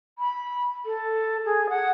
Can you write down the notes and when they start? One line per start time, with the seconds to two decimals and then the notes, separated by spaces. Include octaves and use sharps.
0.19 B5
0.86 A4
1.46 G#4
1.69 F#5